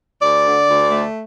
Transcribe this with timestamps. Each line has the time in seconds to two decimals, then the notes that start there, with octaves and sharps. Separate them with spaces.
0.21 D2 D5
0.44 D3
0.68 D2
0.91 A3